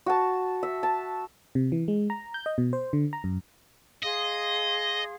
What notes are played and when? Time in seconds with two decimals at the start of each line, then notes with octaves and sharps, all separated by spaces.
0.06 F#4 A5
0.63 E5
0.83 A5
1.55 C3
1.72 E3
1.88 G#3
2.10 A#5
2.34 G6
2.46 D#5
2.58 B2
2.73 C5
2.93 D3
3.13 A#5
3.24 F#2
4.03 G#4 D#5 F5 C6